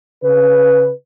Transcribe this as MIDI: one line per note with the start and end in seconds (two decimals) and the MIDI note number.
0.24 0.90 49
0.24 0.90 71